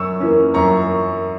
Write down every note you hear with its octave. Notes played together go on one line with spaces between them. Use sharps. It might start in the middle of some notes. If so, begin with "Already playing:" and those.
Already playing: F#2 C#6 E6
E3 A#3 C#4
F#2 A#5 C#6